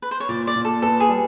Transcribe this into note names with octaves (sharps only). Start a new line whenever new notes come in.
B4
C5
C#5
A#2 D5
D5
A#2
A4
B3 A4
G#4
G3